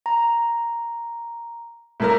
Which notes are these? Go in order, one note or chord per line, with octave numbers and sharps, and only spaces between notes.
A#5
A2 A#3 A#4